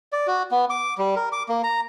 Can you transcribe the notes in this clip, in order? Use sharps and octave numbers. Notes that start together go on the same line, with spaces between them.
D5
F#4
B3
D6
G3
A#4
D6
A#3
A#5